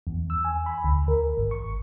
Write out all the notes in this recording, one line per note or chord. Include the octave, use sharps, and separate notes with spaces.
E2
E6
G#5
B5
D2
A#4
G#1
C#6